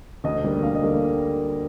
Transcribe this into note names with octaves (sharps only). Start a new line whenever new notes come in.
D2 D#5
D3 G3 A#3
D2 F5
D#5
D3 G3 A#3